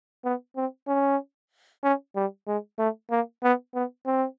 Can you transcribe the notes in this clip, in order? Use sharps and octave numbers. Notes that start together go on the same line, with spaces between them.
B3
C4
C#4
C#4
G3
G#3
A3
A#3
B3
B3
C4